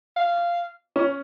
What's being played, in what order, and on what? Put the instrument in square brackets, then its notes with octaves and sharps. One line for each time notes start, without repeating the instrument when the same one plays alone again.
[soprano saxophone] F5
[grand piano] C#4